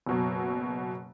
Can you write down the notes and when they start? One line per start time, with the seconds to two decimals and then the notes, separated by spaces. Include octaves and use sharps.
0.07 F#1 B2 F#3